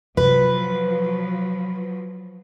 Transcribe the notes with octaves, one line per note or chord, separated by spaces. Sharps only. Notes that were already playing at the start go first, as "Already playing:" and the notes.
C3 F3 F#3 F4 B4